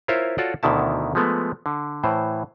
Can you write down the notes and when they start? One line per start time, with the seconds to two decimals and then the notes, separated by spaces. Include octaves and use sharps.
0.08 E4 F4 A#4 C5 C#5 E5
0.38 F4 F#4 A4 C#5 D5 F#5
0.63 D2 B2 D3 D#3 E4 A5
1.15 F3 G#3 A3 B3
1.66 D3
2.04 A2 E3 C5